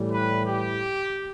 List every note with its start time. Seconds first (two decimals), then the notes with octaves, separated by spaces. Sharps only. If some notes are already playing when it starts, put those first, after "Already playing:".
Already playing: A2 E3 G3
0.10 B4
0.45 G4